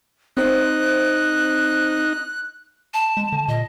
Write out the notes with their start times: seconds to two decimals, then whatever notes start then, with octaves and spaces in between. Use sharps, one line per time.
0.37 C4 D#4 C5 F#6
2.94 A5
3.17 G#3
3.32 D3
3.48 A#2 D#5